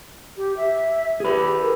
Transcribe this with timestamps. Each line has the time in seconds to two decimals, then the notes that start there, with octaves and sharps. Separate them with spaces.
0.37 G4
0.57 E5
1.20 G4 G#4 B4
1.61 A#4